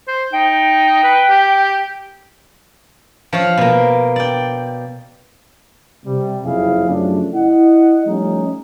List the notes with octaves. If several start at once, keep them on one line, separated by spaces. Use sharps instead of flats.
C5
D#4 G5
B4
G4
F3 C#5 F5
B2 A#3
D5 G5
C3 G3
F#1 F2 C4 E4 G#4 F5
F#2 C#3 F3 A3 D4
E4 D#5 F#5
F3 G3 A3 C#4 D#4